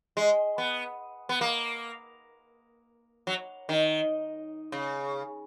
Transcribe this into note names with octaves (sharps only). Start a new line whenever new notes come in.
G#3
B3
B3
A#3
F#3
D#3
C#3